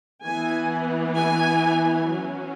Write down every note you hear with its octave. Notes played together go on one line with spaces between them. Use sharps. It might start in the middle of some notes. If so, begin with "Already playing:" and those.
E3 B3 G#5
G#5
F#3 C#4